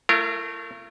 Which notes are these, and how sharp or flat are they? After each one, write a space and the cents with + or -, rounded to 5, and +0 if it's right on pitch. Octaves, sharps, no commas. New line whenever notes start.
A3 +0 F4 -45 A#4 -25